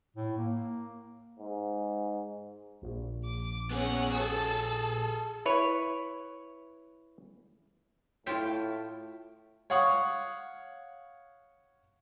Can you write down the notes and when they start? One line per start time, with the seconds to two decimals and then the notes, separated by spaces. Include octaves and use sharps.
0.16 A2
0.37 A#3
1.39 G#2
2.82 A#1
3.24 D6
3.71 B3 C#4 G#4 F#5
4.14 G#4 A4 A5 E6
5.46 E4 B4 C#5
8.27 A2 E4 F4 C#5 E5 G5
9.70 C#5 F5 F#5 C#6 D#6